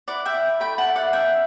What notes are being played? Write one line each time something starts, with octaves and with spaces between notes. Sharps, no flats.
E4 D5 F#5
E5 G5
E4
A3 G5 B5
F#5 A5
E4
D5 F#5
C#4 E5 G5